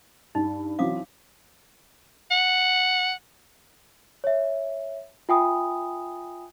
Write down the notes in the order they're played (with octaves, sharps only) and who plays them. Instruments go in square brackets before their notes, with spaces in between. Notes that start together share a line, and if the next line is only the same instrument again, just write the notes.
[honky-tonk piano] G2 [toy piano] D#4
[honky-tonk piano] E3 F#3 C4 [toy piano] F5 D6 D#6
[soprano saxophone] F#5
[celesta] C#5 E5
F4 E5 G5 G#5 B5 D#6